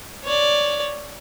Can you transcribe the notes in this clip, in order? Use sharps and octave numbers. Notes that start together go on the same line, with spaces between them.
C#5 D5